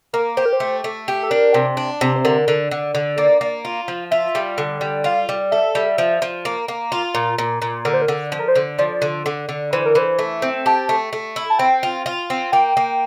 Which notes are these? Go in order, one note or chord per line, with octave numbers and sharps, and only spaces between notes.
A#3 A#4
G4 C5
A#4
C5
A3
A3
G4
A4
D4 A#4
C3
D4
C3
C5
D3 A#4
D3
D3
D3
A#3 D5
A#3
F4
F3
F4 E5
G3
D3
G3
F4 F5
G3
A4 E5
G3
F3
F3
A#3
A#3
F4
A#2
A#2
A#2
D3 A#4
C5
A#4
D3
F3
A#4
C5
D3
F3 D5
D3
D3
D3
E3 C5
A#4
E3 C5
A3
C4
G4 A5
A3
A3
E4
A5
C4 G5
F4
F4
C4
A#3 G5
A#3